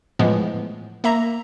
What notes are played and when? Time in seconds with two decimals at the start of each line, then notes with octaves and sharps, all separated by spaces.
0.19 A2 E3 F3 G#3 B3
1.04 A#3 E5 A#5